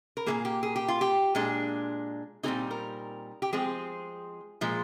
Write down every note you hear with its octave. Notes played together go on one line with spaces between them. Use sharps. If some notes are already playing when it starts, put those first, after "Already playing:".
A#4
A#2 F3 A#3 G#4
G4
G#4
G4
F4
G4
A#2 G#3 D4
A#2 G3 C4 D#4 G#4
A#4
G4
F3 G#3 C4 G#4
A#2 F3 G#3